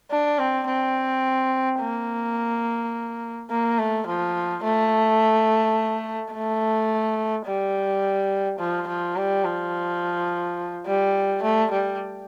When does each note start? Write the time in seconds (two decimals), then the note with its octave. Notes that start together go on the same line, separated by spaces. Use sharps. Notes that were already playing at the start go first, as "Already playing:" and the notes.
0.11 D4
0.39 C4
0.67 C4
1.80 A#3
3.50 A#3
3.78 A3
4.07 F3
4.63 A3
6.33 A3
7.46 G3
8.59 F3
8.88 F3
9.16 G3
9.44 F3
10.86 G3
11.43 A3
11.71 G3